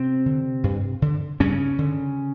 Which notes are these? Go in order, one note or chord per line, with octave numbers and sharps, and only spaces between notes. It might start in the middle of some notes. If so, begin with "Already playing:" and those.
Already playing: C3 C4
D3
G2
D3
G2 C#3 C#4
D3